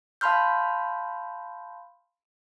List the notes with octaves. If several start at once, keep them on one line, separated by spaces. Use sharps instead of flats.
F5 A5 B5 C6 F6 G6